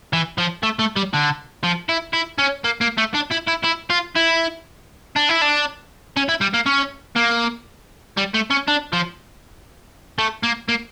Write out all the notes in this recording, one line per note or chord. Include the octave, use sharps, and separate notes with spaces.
E3
F3
A3
A3
G3
D3
F3
E4
E4
C#4
A#3
A#3
A3
D4
E4
E4
E4
F4
E4
D4
E4
D4
C#4
E4
G3
A#3
C#4
A#3
G3
A3
C#4
D4
F3
A3
A#3
A#3